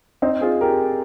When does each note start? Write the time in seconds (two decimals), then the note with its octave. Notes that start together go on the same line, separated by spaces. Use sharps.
0.22 C4 D#4
0.41 F4 G#4
0.61 G4 A#4